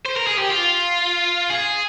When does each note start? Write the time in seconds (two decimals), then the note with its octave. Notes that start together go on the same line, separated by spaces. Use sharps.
0.06 C5
0.17 A#4
0.27 G#4
0.39 G4
0.50 F4
1.50 G#4